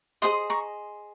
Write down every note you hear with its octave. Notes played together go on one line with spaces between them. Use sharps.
G#4 C5 D#5 C6 D#6
A#5 C#6